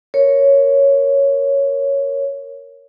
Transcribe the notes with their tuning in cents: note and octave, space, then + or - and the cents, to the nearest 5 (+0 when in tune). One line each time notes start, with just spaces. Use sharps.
A#4 +0 C#5 +0